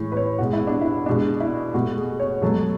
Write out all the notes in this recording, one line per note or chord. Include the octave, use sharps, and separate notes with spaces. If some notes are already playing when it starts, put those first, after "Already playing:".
Already playing: A2 E3 G#3 C#5
B4
C#5
B2 G#3 F#4
E4
D4
E4
B2 G#3 D4
E4
B2 A3 F#4
G#4
C#5
B2 F#3 A3 A4